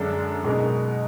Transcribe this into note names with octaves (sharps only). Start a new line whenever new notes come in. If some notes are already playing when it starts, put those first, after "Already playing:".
Already playing: F#2 D3 G#3 D4
B2 G#3 D#4 A#4